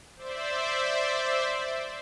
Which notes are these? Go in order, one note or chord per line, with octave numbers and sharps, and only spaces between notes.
C5 D5 E5